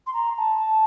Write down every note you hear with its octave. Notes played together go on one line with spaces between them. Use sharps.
C6
A#5
A5